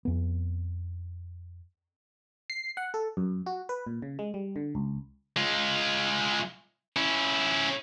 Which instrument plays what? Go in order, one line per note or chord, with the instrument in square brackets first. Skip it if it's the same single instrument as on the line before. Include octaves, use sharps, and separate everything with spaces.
[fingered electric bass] F2 B3
[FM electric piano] C7
F#5
A4
F#2
F#4
B4
A#2
C#3
G#3
G3
D3
C#2
[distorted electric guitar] G#3 F4
C#4 E4